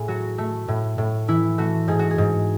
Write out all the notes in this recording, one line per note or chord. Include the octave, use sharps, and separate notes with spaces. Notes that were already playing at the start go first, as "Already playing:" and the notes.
Already playing: A2 A3 G#4
F#3 F#4
A3
A2
A2
E3 E4
A3 F#4
G#2 G#4
F#4
G#4
G#2